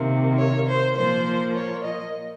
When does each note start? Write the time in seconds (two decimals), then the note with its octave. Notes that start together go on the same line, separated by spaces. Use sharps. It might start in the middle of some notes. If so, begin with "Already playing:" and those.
Already playing: C3 D#3 A#3
0.38 C#5
0.67 C5
0.96 A#2 F3 A#3 C5
1.55 C#5
1.83 D#5